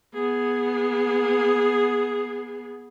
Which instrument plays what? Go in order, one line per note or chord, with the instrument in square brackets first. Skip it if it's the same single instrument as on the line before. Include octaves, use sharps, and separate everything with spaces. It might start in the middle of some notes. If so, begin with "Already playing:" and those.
[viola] B3 G#4